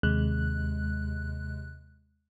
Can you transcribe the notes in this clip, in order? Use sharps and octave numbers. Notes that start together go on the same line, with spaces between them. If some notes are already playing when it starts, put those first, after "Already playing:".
D#2 C3 G#3 F#6